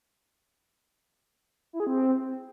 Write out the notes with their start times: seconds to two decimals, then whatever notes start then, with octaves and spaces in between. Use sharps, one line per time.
1.73 E4
1.80 G#4
1.87 C4